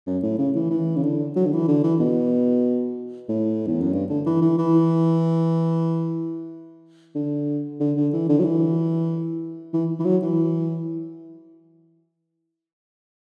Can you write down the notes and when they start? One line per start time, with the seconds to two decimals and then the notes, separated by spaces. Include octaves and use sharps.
0.07 F#2
0.23 A2
0.38 C#3
0.55 E3
0.70 E3
0.96 C#3
1.03 D3
1.36 F#3
1.46 D3
1.52 E3
1.68 D3
1.83 E3
2.00 B2
3.28 A2
3.67 E2
3.80 F#2
3.93 G2
4.09 D3
4.26 E3
4.41 E3
4.58 E3
7.15 D3
7.80 D3
7.96 D3
8.13 E3
8.29 D3
8.39 F#3
8.44 E3
9.73 E3
9.99 E3
10.05 F#3
10.22 E3